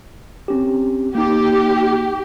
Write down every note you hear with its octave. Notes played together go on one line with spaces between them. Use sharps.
C4 C#4 G4
A#3 D#4 G4